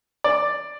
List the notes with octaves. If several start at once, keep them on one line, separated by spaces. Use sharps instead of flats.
D5